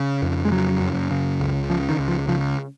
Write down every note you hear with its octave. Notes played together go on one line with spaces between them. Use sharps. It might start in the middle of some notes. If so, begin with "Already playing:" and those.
Already playing: C#3
F2
G#3
C#3 F#3
F#2
C#3
C#2
C#3 F3
D#3
C#2
F3
C#3 F3